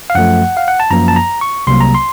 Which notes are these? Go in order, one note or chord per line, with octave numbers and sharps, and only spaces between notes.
F5
F#2 F3 A3 F#5
F5
F#5
A5
F#2 F3 A#3 A#5
A5
A#5
C#6
C2 C3 F#3 A#3 C6
A#5
C6